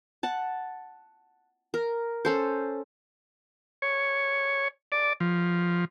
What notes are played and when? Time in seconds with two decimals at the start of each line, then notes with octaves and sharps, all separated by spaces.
0.23 F#5 A5
1.74 A#4
2.25 C#4 A4 C5
3.82 C#5
4.92 D5
5.20 F3